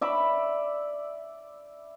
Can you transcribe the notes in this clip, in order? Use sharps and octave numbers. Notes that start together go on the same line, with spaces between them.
D5 E5 B5